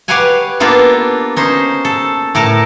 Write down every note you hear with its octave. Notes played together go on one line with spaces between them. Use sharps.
G4 B4 C#5 F5 F#5 G#5
A#3 B3 D4 F4 A4
C#4 D#4 C5
A4
A2 A4 A#4 A5